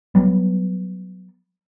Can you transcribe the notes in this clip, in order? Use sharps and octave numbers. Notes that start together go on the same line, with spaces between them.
F#3 G3 B3